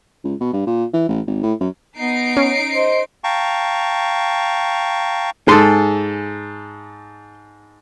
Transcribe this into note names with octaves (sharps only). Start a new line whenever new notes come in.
C#2
B2
G2
A#2
E3
A1
G#1
A2
F#2
B3 D#4 C7 D7
C#4
C5 D#5
F5 G5 A5 A#5 C#6
G#2 G#4 A4 C6